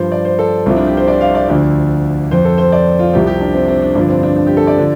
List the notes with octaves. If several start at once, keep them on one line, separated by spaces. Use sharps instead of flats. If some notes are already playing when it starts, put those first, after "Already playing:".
Already playing: G2 F3 C5
D5
C5
A4
C2 C3 F3 F4
D4
G4
C5
D5
F5
D5
D2 D3 F3 D5
F2 F3 C5
A4
C5
D5
F4
C2 C3 F3 G4
G4
D4
C4
C4
D4
G2 D3 F3 D4
C4
D4
D4
G4
A4
D5
D3 F3